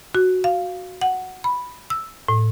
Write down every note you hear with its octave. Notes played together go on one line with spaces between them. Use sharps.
F#4
F5
F#5
B5
E6
A2